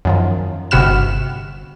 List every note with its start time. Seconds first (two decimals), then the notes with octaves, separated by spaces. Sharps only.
0.05 F#2 D#3 F3
0.71 G1 C3 F#4 B5 F6 E7